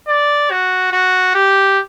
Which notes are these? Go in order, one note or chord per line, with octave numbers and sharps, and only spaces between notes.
D5
F#4
F#4
G4